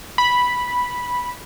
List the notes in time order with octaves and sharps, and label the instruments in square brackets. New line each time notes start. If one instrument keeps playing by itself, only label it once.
[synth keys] B5